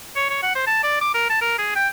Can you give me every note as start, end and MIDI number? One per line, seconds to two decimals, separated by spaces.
0.16 0.27 73
0.30 0.41 73
0.42 0.52 78
0.55 0.66 72
0.67 0.80 81
0.83 1.01 74
1.01 1.11 86
1.14 1.29 70
1.30 1.41 81
1.42 1.55 70
1.58 1.74 68
1.76 1.88 79